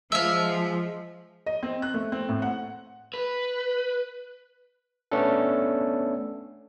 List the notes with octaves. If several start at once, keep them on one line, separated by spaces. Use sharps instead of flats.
F3 G#3 E5 F5
D#5
C4
F#6
A3
C4
A2
F#5
B4
A3 B3 C#4 D4 A4